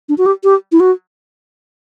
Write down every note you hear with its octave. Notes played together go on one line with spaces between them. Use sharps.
D4
F#4
G4
G4
E4
F#4